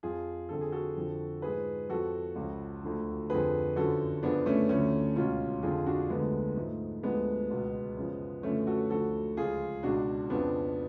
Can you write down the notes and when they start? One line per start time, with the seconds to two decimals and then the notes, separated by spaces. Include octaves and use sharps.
0.03 F2 F3 F4 G#4
0.49 F2 D3 F3 A4
0.61 G#4
0.72 F#4 A4
0.97 F2 D3 F3
1.42 G#2 F3 G#4 B4
1.89 F2 F3 F#4 A4
2.36 C#2 C#3 F3
2.83 D2 D3 F3
3.29 F2 D3 F3 G#4 B4
3.76 F#2 D3 F3 F#4 A4
4.23 F#2 C#3 F3 B3 D4
4.46 A3 C#4
4.69 D2 D3 F3 A3 C#4
5.16 C#2 B2 C#4 F4
5.63 F2 D3 F3 F4 G#4
5.86 D4 F#4
6.09 D2 D3 F3 G#3 B3
6.57 G#2 F3 A3
7.03 D2 D3 F3 G#3 B3
7.50 C#2 B2
7.97 F#2 C#3 F3
8.43 F#2 D3 F3 A3 C#4
8.67 F#4 A4
8.90 D2 D3 F3 F#4 A4
9.37 C#2 C#3 F3 F4 G#4
9.83 C#2 B2 D4 F#4
10.30 F2 C#3 F3 B3 D4